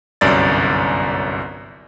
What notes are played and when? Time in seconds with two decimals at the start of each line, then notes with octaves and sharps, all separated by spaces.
0.21 G1 C2 F#2 D5 A6